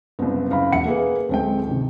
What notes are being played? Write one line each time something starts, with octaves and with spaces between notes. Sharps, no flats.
F#1 C2 B3
F#1 F5 B5
E1 E5 F#5 C#7
A#3 G#4 B4
D1 G#3 C4 A4 G5
C3 D#3